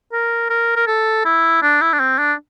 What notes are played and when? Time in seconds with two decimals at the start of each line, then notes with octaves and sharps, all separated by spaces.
0.12 A#4
0.50 A#4
0.76 A#4
0.87 A4
1.25 E4
1.62 D4
1.81 E4
1.93 D4
2.00 C4
2.18 D4